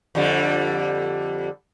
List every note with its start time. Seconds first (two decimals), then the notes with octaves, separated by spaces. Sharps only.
0.15 F2 D3 G3